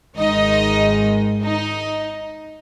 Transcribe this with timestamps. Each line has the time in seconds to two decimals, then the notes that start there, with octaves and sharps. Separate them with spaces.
0.16 G#1 G#2 D#3 G#3 D#4 D#5
1.43 D#4 D#5